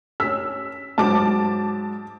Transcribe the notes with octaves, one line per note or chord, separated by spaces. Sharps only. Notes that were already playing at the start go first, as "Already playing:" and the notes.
C#4 E6 B6
G#2 F#3 A5 D6